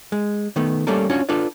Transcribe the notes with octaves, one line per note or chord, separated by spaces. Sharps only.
G#3
D#3 A3 B3
G3 A3 A#3 C#4 A4 A#4
C#4 D4 F4 F#4 C#5
D4 F4 A4 B4 D5